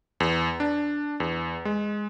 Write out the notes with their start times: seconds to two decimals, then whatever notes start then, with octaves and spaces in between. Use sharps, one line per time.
0.20 E2
0.60 D4
1.20 E2
1.65 G#3